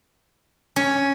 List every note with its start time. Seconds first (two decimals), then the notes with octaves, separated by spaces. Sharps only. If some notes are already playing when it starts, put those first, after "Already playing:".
0.76 C#4